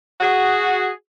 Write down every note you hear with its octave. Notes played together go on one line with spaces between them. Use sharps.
F#4 G#4